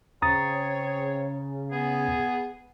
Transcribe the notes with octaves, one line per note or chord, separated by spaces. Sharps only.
C#3 C4 G#4 C#5 A#5 D#6 A6
B3 G#4